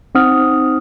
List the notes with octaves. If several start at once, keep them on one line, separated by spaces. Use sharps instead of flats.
C4 D#4 C5 F#5 D#6 F6